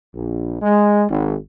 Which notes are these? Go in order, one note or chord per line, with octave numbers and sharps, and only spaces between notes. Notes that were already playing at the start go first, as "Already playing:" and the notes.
A#1
G#3
G#1